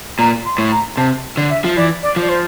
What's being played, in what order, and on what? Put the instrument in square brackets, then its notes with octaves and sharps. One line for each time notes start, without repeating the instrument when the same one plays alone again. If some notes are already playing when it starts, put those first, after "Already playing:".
[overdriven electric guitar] A#2 [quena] A#5
[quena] C6
[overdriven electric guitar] A2
[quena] A#5
[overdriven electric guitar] C3 [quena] A5
[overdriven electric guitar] D3
[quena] E5
[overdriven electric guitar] F3
[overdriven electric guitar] E3 [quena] D5
[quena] D5
[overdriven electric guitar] F3
[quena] D5
C5